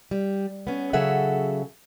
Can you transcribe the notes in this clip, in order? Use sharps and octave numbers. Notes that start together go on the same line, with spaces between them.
G3
B3 C#4
C#3 F#3 G#4 A4 E5 F#5